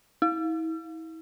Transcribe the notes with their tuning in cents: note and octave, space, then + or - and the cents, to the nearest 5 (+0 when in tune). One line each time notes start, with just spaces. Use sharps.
E4 -35